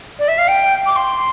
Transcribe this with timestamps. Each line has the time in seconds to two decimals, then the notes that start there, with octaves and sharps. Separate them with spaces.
0.19 D5
0.28 E5
0.38 F5
0.48 G5
0.86 D6
0.96 C6